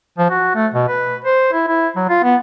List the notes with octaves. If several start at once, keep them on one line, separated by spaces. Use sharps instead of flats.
F3
F#4
A3
B2
B4
C5
E4
E4
F#3
F4
B3